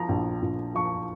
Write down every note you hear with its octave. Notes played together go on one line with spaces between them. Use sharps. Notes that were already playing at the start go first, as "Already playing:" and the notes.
Already playing: F3 A#5
A#1
A#1
F3 C#6